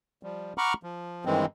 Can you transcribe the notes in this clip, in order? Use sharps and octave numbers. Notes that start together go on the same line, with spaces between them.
F3 G3
F#5 A#5 B5 C#6 D6 F6
F3
G2 D#3 E3 G#3 C4